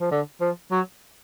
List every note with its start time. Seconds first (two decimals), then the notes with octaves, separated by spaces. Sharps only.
0.01 F3
0.11 D3
0.41 F3
0.71 F#3